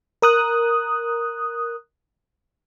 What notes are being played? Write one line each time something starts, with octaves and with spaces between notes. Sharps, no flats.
A#4 D#6 F#6